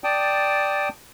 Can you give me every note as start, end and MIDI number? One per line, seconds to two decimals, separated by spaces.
0.04 0.89 74
0.04 0.89 79
0.04 0.89 81
0.04 0.89 87